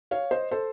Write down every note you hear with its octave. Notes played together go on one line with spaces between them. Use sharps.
C#5 F5
C5 D#5
A4 C5